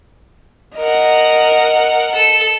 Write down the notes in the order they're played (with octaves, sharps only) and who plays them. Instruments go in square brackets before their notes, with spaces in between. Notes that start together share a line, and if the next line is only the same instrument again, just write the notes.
[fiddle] A#4 F#5 [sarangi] D#5
[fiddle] A4 E6